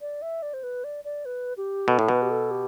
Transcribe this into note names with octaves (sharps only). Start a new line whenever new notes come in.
D5
E5
D5
C5
B4
D5
D5
B4
G4
B2 A4
A2
B2 B4
G4
A4
G4